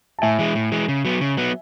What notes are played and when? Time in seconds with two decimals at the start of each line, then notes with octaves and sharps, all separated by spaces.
0.19 A5
0.22 A2 E5 G#5
0.39 E3 G#3
0.55 A2
0.72 E3 G#3
0.89 C#3
1.05 F#3 B3
1.21 C#3
1.37 F#3 B3